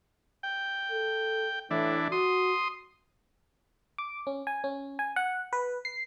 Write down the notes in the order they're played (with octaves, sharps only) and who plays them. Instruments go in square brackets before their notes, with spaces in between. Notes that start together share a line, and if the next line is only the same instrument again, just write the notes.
[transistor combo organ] G5
[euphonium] A4
[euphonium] A2 [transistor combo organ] E3 D4
[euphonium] F#4 [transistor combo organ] C6 D#6
[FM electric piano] D6
C#4
G#5
C#4
G#5
F#5
B4
C7